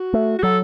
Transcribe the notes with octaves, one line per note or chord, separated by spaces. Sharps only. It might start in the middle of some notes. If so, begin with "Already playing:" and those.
Already playing: F#4
A3
F#4
F#3 A4